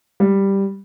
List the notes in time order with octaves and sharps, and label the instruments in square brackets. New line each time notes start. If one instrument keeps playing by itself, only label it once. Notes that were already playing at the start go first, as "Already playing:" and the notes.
[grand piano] G3